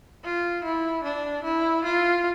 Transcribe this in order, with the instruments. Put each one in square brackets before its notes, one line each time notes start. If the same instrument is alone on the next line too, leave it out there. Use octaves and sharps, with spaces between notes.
[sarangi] F4
E4
D4
E4
F4